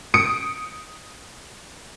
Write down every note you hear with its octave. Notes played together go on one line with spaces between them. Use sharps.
D#6 C#7 D7